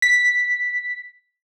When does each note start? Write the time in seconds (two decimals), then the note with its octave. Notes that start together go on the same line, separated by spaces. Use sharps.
0.02 B6